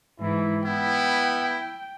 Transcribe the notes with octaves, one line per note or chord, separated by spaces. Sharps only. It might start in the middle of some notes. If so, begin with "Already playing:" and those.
G#2 E3 E4
B3 E4 G5